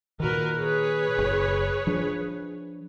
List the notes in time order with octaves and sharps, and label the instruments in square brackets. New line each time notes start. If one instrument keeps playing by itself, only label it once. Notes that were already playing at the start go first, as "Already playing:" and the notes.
[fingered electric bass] A#2 D#3 [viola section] F#4 A#4 B4
[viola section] G#4 B4 C#5
[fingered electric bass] F#1
F3 D4